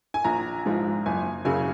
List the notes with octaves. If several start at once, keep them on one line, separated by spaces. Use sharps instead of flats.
G#5
A#1 A#5
G#2 F3
F#1 G#5
F#2 C#3 F#3 G#5